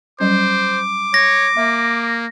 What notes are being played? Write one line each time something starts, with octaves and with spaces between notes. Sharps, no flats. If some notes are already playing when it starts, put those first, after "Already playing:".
F#3 G3 C#4 C5 D6
C#5 A#6
A#3 E5